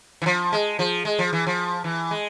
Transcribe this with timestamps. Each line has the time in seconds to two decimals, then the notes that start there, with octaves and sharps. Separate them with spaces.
0.22 E3
0.26 F3
0.53 G#3
0.79 F3
1.05 G#3
1.19 F3
1.33 E3
1.47 F3
1.84 E3
2.11 G#3